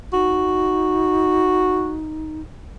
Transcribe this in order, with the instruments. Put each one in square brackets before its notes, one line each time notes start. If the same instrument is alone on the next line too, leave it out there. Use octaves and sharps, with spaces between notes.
[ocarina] D#4 [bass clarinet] F#4